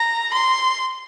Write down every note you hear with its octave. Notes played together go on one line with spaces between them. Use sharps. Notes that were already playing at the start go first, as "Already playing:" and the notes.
Already playing: A#5
C6